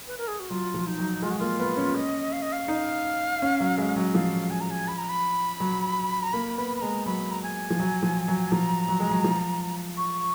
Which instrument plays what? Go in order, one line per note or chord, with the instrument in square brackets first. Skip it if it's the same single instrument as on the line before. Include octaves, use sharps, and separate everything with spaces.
[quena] B4
A#4
G#4
F#4
[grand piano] F#3 [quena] F4
[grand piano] F3
[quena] D#4
[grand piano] F#3
[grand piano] G#3 [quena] F4
[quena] F#4
[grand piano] A#3 [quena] F4
[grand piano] B3
C#4
[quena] D#5
F5
D#5
F5
[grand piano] D#4
C#4
F#3
G#3
F#3
[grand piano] F3 [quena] F5
[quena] G#5
A#5
G#5
B5
A#5
B5
[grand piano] F#3
[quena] A#5
[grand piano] A#3 [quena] B5
[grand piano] B3 [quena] B5
[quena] B5
[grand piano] G#3 [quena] A#5
[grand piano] F#3 [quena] B5
[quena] A#5
G#5
[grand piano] F3
F#3
F3
F#3
[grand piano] F3 [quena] A#5
[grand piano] F#3
G#3
F#3
F3
[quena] C#6